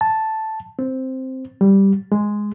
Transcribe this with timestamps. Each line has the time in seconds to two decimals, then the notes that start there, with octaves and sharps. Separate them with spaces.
0.01 A5
0.79 C4
1.61 G3
2.12 G#3